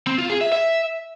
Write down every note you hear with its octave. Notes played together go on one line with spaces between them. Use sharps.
C4
F4
G#4
E5
E5